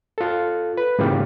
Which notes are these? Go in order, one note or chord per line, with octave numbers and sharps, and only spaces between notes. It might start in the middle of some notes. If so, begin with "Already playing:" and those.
F4 A4
B4
G#2 C#3 E3 A#3 F4 G4